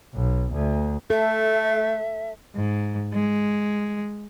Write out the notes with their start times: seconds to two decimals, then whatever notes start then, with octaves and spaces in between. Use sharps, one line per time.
0.15 B1
0.53 D2
1.10 A3 A4 E5
2.55 G#2
3.13 G#3